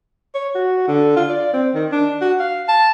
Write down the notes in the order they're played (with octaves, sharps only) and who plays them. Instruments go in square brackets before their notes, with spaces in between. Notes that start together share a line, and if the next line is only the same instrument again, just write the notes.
[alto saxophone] C#5
F#4
D3
F4
D5
C4
D#3
D4
F#4
F5
A5